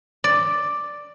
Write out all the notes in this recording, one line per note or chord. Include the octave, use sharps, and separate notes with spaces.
D5